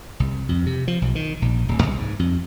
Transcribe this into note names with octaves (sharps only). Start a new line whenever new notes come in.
C2
F2
C3
F3
B1
D#3
A#1
D1
C2
G#2
F2